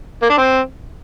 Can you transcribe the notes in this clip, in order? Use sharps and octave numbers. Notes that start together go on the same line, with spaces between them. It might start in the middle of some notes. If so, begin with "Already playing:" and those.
A#3
D4
C4